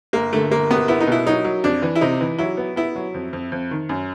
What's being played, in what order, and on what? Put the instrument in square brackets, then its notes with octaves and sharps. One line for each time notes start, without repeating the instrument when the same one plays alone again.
[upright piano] G1 [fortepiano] A#3
[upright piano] D3 [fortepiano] A3
[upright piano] G1 [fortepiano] A#3
[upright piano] G1 [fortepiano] B3
[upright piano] B3 [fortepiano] E4
[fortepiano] D#4
[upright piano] B2 [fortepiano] E4
[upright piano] F#3 [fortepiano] D#4
[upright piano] F#3
[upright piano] F2 [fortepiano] D4
[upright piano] E3
[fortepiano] E4
[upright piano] C3 [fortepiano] D#4
[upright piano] E3
[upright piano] F#3 [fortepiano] E4
[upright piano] B3
[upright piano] B3 [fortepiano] E4
[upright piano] F#3
F2
F2
F2
D#3
F#2